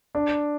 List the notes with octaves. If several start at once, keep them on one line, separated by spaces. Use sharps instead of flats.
D4